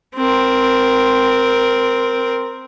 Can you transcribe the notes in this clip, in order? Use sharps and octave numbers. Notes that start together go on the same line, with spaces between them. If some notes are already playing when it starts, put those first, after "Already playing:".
C4 A#4